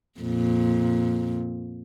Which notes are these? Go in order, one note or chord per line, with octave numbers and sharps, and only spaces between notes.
F2 A#2